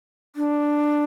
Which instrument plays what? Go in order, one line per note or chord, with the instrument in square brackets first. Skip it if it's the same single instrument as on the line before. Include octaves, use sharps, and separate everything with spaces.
[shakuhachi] D4